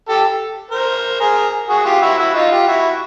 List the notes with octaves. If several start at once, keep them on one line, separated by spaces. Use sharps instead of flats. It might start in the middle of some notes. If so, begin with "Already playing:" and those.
G4 A4
A#4 C5
G#4 A#4
F#4 G#4
F4 G4
E4 F#4
E4 F#4
D#4 F4
F4 G4
E4 F#4